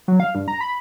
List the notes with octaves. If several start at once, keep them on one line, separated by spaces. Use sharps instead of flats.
F#3
F5
G2
A#5
B5